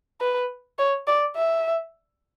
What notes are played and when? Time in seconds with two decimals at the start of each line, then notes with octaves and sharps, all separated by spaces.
0.20 B4
0.79 C#5
1.07 D5
1.36 E5